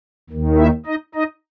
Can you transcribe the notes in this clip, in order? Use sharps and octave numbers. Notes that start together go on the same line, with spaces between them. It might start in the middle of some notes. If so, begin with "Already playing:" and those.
D#2 D#3
E4 E5
D#4 D#5
D#4 D#5